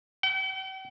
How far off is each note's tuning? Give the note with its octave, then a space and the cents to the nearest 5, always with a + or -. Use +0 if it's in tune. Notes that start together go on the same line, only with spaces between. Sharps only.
G5 -45